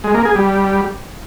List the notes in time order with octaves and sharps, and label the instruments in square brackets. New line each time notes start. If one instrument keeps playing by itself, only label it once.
[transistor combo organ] G#3
A#3
G#4
G3